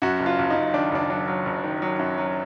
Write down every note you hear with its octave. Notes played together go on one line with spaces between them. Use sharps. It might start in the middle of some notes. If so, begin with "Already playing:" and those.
F#2 F#4
F#1
F4
F#1
D#4
F#2
D#3 D4
F#1 D4
F#3 D4
F#3
F#1
D#3
F#3
F#2
F#3